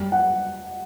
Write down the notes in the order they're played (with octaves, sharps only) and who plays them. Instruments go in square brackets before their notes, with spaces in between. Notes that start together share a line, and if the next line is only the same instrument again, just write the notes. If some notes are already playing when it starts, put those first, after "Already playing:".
Already playing: [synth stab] F#2 G3
[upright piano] F#5